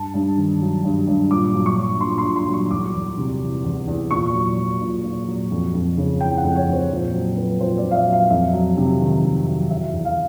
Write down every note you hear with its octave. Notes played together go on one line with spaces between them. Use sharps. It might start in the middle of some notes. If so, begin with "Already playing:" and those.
Already playing: G2 A5
G2
D#3
F#3
G2
G2
A#2 D6
F#3
C#6
F#3
A#2 C6
C6
A#2
C6
F#3
C#6
E2 D6
E2
C3
E3
E2
E2
A#2 C#6
F#3
F#3
A#2
A#2
F#3
F2
F2
C#3
E3 G5
F#5
F2
C#5
F2
C5
A#2
F#3
F#3 B4
A#2 C5
D5
A#2
F5
E5
F#3
F5
F2 E5
F#3
C3
D#3
F2
F#3
E2 E5
E2
F5